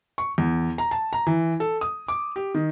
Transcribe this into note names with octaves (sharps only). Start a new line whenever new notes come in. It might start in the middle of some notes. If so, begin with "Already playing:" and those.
C#6
E2
A#5
A5
A#5
E3
A4
D#6
D6
G4
D#3